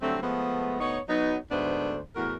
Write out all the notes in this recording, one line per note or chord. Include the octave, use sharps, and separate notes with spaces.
D3 F#3 G3 A3 C4
F3 G#3 A3 B3
D2 B3 D#4 C#5
F#3 B3 D#4
D2 G#2 A3 B3 D4 C5
E2 A2 F#4 A#4